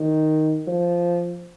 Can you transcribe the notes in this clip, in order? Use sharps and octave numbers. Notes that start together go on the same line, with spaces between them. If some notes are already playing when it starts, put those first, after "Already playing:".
Already playing: D#3
F3